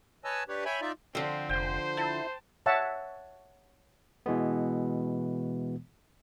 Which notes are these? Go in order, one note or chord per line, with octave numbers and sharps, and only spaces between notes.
B4 C#5 D#5 G#5 A5 E6
D4 G4 B4 C#5
C#5 E5 G5 G#5 B5
D#4 F4 D5 E5
D3 F3 C4
F1 C5 G5
E4 A5
C#5 E5 F#5 A5
B2 E3 G#3 B3